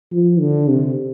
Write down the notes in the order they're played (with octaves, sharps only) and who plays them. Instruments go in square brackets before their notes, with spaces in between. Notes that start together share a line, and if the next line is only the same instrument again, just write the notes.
[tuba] F3
D3
C3